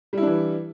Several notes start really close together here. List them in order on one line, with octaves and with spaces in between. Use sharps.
G3 E4 D4 E3